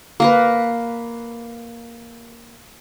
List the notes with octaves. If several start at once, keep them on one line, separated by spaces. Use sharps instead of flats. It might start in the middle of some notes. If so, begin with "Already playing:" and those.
A#3 A#4 B4